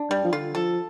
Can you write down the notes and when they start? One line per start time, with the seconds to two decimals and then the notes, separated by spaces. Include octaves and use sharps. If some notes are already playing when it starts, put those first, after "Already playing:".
Already playing: D4
0.10 G2 G3
0.24 F3
0.32 D3 F4
0.55 F3 A4